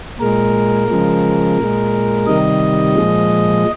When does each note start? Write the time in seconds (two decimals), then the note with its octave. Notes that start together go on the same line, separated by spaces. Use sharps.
0.19 A#2 G#3 A#4
0.88 C#3 F3 G#3
1.57 A#2 G#3
2.27 C3 D#3 G3 D#5
2.96 A#2 F3 G#3